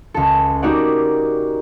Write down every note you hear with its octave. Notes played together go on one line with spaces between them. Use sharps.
C#2 A4
A#3 D#4 F#4 G4 D5 F#5